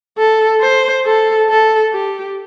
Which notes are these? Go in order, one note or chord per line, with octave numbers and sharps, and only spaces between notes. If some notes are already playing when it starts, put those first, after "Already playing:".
A4
C5
A4
A4
G4